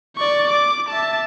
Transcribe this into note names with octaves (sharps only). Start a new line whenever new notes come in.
D5 C#6
D6
E5 A5